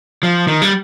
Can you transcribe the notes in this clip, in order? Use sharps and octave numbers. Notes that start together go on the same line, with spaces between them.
F3
D#3
G3